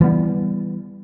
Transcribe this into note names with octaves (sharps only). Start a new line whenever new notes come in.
E3 G3 B3